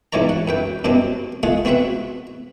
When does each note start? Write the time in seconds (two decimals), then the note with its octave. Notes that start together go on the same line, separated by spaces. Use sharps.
0.13 B1 E2 G#2 C#5 D5 A#5
0.29 F#5
0.48 F#2 B4 G5
0.84 F#2 B2 F#3 G3 C4
1.43 G#3 A3 F4 G#4 F#5
1.65 B3 C4 F#4 B4 E5 F#5